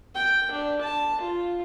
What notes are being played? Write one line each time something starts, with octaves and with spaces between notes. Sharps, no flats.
G5
D4
A5
F4